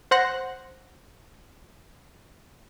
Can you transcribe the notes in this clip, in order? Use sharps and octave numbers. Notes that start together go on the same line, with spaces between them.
C5 F#5 C6 F#6 A#6